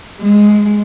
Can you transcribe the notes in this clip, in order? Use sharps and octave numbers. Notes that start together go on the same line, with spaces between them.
G#3